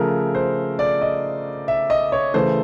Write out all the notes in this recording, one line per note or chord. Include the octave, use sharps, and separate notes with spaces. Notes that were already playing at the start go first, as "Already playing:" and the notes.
Already playing: C#3 F3 A3 A#4
C5
D5
D#5
E5
D#5
C#5
C#3 E3 A3 C5